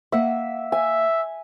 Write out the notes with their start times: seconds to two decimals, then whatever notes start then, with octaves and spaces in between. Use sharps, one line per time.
0.12 A#3 E5 F#5
0.72 E5 G#5